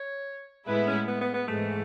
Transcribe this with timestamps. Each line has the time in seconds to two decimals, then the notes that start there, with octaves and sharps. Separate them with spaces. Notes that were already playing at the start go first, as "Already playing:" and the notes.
Already playing: C#5
0.68 A2 G#3 B3 E4 B4
0.87 C#4
1.08 B3
1.21 B3
1.34 B3
1.48 G#2 E3 G#3 A3